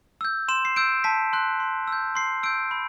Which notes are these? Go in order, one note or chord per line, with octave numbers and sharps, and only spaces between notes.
E6 G6
C6 E7
C7
E6 G6 D7
A5 B6
C6 F#6
C6
E6 G6
C6 C7
E6 G6 D7
B5